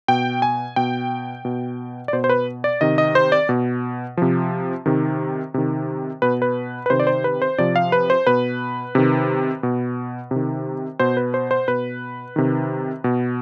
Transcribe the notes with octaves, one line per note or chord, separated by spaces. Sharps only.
B2 G5
G#5
B2 G5
B2
D5
B2 C5
C5
B4
D5
C3 D#3 D#5
D#5
C5
D5
B2
C3 F3
C3 D#3
C3 D#3
B2 B4
B4
B4
C3 D#3 C5
D5
C5
B4
C5
C3 F3 D5
F5
B4
C5
B2 B4
C3 D#3
B2
C3 D#3
B2 C5
B4
C5
C5
B2 B4
C3 D#3
B2